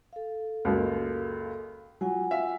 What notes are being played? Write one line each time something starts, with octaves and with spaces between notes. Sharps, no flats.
A4 F5
C#2 F#2 A#3
F#3 F4 F#5 G#5
E5 F5